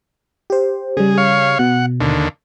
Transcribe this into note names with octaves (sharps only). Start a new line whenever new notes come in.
G4 C5
C#3 G3 G#4
C#5 F5
B2 F#5
D#2 D3